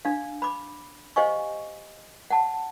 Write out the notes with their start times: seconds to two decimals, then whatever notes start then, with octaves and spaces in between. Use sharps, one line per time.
0.05 D4 F5
0.42 B5 D6
1.16 G4 C5 D#5 F5 G#5 C#6
2.31 F#5 A5